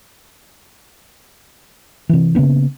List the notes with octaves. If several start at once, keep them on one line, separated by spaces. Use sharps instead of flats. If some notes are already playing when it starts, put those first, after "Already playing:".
C3 E3
C#3 A#3 B3 D4